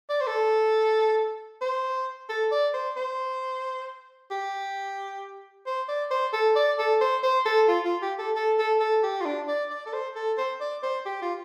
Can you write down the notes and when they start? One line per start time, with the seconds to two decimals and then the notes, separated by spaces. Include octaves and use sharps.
0.10 D5
0.21 C5
0.27 A4
1.61 C5
2.29 A4
2.52 D5
2.74 C5
2.97 C5
4.31 G4
5.66 C5
5.88 D5
6.11 C5
6.33 A4
6.56 D5
6.78 A4
7.01 C5
7.23 C5
7.45 A4
7.68 F4
7.85 F4
8.02 G4
8.19 A4
8.36 A4
8.58 A4
8.80 A4
9.03 G4
9.21 F4
9.25 D4
9.48 D5
9.70 D5
9.86 A4
9.93 C5
10.15 A4
10.38 C5
10.60 D5
10.83 C5
11.06 G4
11.22 F4